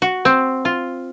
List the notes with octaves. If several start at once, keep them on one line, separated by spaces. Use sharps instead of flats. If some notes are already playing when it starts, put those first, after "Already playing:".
F#4
C4
F4